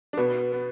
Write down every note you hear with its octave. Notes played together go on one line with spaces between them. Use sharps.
D4
B2 B3 B4
B3